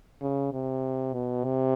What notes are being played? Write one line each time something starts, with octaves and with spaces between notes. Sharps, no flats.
C#3
C3
B2
C3